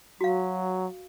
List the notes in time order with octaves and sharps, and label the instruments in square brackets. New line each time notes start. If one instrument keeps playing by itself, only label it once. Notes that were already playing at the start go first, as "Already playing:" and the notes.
[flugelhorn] F#3 [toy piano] F#4 F5